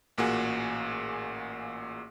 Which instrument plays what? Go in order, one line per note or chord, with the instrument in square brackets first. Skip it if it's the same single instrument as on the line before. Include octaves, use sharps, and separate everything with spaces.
[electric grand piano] A1 A#2 A#3 F#4 G#4